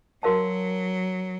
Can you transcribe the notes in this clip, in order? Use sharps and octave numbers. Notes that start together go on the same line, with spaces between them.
F#3 F#4 A#4 F5 A5